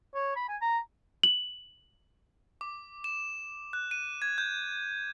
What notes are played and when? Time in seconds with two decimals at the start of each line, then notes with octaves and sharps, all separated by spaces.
0.14 C#5
0.36 B5
0.48 G#5
0.62 A#5
1.23 F#7
2.61 D6
3.04 E7
3.73 F#6
3.91 D#7
4.22 G#6
4.38 G6